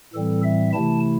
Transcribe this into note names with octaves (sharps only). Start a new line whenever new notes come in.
A2 E3 G3 C4 A4
E5
C3 E3 A3 E4 A5